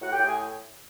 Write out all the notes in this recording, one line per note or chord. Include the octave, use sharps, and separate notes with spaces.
A2 F#4 F#5
G4 G5
A2
G#4 G#5